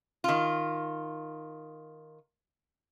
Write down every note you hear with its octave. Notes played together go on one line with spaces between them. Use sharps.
D#3 F4